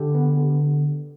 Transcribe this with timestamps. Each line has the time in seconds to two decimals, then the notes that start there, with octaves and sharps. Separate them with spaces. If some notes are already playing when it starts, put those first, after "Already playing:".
Already playing: D3 G4
0.15 B3
0.37 D3